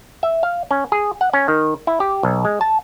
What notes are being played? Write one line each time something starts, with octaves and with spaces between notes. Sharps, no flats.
E5
F5
C#4
G#4
F#5
C#4
D#3
E4
G4
B1
G#3
A5